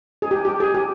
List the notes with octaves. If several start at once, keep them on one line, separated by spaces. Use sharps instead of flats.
G#4
G4
G4
G#4
G4